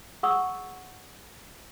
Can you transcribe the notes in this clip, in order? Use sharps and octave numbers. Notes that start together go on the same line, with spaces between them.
G#4 F#5 C#6 D#6 E6